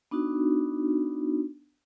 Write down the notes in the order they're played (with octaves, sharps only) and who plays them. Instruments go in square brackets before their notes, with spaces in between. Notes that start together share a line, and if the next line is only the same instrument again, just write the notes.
[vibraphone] B3 D4 D#4 F#4